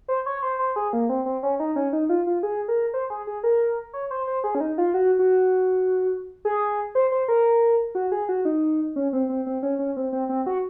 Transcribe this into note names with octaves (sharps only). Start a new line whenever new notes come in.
C5
C#5
C5
C5
G#4
A#3
C4
C4
C#4
D#4
C#4
D#4
F4
F4
G#4
A#4
C5
G#4
G#4
A#4
C#5
C5
C5
G#4
C#4
D#4
F4
F#4
F#4
G#4
C5
C5
A#4
F#4
G#4
F#4
D#4
C#4
C4
C4
C4
C#4
C#4
C4
C4
C4
F#4